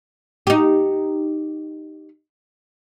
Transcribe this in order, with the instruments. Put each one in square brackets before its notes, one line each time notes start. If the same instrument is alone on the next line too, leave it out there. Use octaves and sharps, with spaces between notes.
[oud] D#4 G4